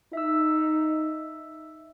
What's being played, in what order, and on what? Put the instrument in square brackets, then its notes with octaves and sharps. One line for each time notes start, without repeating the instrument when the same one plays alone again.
[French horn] D#4 [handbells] E5 E6